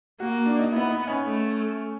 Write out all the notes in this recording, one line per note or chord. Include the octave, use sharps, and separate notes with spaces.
A#3 F#4
D4
D#4
B3 E4
D#4
C#4
A3